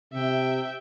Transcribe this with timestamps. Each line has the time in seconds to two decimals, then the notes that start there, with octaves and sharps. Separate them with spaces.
0.14 C3 E5 G5